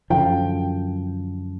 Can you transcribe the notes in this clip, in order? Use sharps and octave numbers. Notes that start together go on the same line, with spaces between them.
F#2 D3 F3 G5